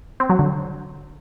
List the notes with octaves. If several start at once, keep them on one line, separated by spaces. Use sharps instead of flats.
C4
F#3
D3